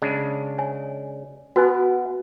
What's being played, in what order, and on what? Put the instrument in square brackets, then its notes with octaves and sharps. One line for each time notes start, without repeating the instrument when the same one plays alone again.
[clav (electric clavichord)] C#3 G#3 D4
[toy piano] C#5 G#5
[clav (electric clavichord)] B3 [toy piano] F#4 B4 G#5